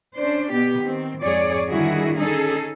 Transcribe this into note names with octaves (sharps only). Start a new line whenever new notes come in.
C#4 D4 C5 D5
B2 B3 G4
D#3 C4
F2 G#2 G#4 C#5 D5
D3 D#3 G3 E4 F#4 G#4
C#4 D#4 G#4 A4